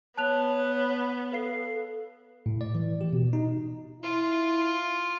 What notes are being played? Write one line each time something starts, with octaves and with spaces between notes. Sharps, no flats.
B3 C#5 A5 F#6 F7
A4 B4 F5 C7
A2
D5
E3
G4
B2
D#4
E4 F4